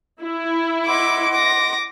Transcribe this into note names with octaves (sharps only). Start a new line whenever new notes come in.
E4
D#5 F#5 C6 D6
D6 A#6